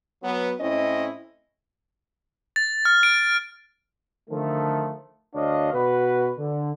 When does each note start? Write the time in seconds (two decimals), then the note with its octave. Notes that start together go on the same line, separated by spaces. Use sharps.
0.23 F#3 B3
0.60 A2 C4 C#4 E4 D#5
2.56 A6
2.85 F6
3.03 D7
4.30 D3 D#3 F3 A3
5.34 D2 D4 C#5 D#5 F5
5.73 B2 F#4 B4
6.38 D3